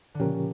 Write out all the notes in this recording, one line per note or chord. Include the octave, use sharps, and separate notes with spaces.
D3
A#2 C#3 F3 C#4 G4 A#4